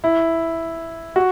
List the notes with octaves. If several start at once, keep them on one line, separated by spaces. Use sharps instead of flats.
E4
F#4